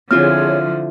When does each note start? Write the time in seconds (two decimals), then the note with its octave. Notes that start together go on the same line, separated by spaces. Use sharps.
0.11 D3 F3 C4 E4 F4 G#4 C#5 F6